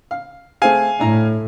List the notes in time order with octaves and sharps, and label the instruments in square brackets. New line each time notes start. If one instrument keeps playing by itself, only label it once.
[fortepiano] F5
[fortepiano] A3 C4 G#4 [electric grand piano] F5 G#5
[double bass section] A2 [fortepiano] D4 E4 A#5